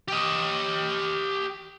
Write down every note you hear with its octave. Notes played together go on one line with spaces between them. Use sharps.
G4 D#5